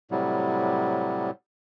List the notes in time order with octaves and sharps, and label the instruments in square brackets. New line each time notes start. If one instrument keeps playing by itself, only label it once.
[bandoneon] A2 C3 F#3 G3